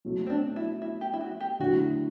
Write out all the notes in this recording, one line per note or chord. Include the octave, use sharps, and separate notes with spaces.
B2 F#3 A3
C4
D4
E4
E4
G4
E4
F#4
G4
D3 F#3 A3 E4 F#4